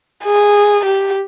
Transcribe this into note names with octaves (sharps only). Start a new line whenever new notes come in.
G#4
G4